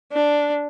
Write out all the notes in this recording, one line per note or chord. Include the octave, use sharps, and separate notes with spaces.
D4